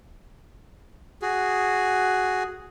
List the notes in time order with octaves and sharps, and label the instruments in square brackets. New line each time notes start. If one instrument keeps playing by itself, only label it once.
[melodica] F#4 G#4